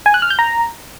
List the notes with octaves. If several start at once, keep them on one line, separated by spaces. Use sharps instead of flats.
G#5
F#6
F6
G6
A#5